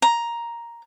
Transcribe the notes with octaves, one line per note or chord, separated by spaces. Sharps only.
A#5